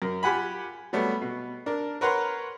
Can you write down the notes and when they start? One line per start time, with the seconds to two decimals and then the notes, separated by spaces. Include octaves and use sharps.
0.02 F#2 A#4
0.23 F4 G4 F#5 G#5 B5
0.93 F#3 G3 A3 B3
1.22 B2
1.66 D4 A#4
2.01 A#4 B4 C#5 F#5 A#5 C6